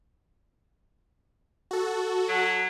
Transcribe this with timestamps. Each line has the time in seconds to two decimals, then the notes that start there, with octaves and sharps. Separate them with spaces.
1.71 F#4 A4
2.28 F#3